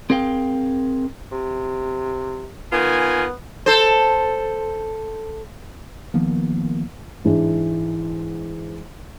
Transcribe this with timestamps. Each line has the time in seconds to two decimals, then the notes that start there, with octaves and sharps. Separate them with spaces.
0.10 C4 G#4 A#4 F5 G5
1.32 C3
2.72 D#3 B3 F4 G#5
3.66 A4 C5
6.14 D#3 F3 A#3 B3
7.25 G#2 E3 G#3 D4